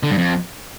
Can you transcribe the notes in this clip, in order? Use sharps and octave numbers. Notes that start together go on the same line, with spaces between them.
D3
G2
F2